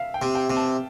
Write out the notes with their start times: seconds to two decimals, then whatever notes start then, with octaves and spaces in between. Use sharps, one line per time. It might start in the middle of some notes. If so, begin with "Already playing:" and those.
Already playing: E5 F5
0.14 G5
0.22 C3
0.35 G5
0.50 C3
0.56 A5